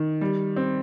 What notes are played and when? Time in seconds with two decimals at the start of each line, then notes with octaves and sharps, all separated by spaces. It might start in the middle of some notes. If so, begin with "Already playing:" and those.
Already playing: D#3
0.21 G3
0.56 C4